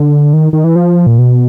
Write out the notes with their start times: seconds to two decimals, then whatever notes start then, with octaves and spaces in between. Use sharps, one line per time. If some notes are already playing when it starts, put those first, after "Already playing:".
Already playing: D3
0.33 D#3
0.53 D#3
0.64 E3
0.76 F3
1.07 A#2
1.19 B2